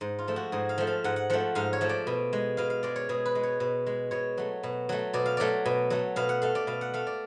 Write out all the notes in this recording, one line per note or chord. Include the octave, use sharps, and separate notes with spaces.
G#2
F4
F3 A3
F#4
G#2 G#4
F5
F3 A3
F5
G#2 F#5
F#5
F3 A3 F#5
G#2 F5
C#5
F3 A3
D5
B2
G#3
B2 F5
F5
G#3 D5
C#5
B2 G#4
B4
G#3
C#5
B2
G#3
B2 C#5
F#3 A3
B2
F#3 A3
B2 D5
F5
F#3 A3 D5
B2
F#3 A3
B2 F5
F#5
A3 F5
D5
B2 F5
F#5
A3 F5
D5